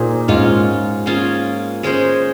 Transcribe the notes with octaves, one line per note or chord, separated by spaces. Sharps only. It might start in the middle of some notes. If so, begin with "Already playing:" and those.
Already playing: A#2 A#3 D#4 G#4 C5
G#2 G#3 C#4 F4
A#3 C#4 F4 G#4
G#3 C#4 G#4 C5